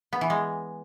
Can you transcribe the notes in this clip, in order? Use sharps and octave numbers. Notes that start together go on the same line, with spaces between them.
B3
E3
G#3